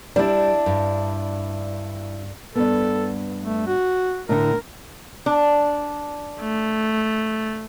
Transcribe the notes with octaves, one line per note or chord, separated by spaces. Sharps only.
G3 D4 E4
G2
G2 B3 A4
A3
F#4
A2 D3 A#4
D4
A3